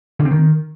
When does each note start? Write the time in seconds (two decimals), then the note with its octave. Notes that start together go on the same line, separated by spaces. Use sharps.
0.19 D3
0.25 C4
0.31 D#3